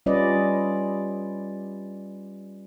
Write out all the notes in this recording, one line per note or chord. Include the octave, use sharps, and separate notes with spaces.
G3 C#4 F4 B4 D5 D#5